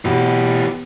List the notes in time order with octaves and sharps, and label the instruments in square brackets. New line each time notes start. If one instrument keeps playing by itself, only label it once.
[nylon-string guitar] B2 [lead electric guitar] E3 G4